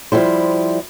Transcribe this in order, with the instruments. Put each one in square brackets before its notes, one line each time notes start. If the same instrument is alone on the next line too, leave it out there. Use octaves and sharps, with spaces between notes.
[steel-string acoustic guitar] F3 G3 E4 C5